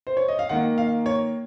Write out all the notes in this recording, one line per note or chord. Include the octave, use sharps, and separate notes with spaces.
C5
C#5
D#5
F5
D#3 A#3 F#5
F5
C#5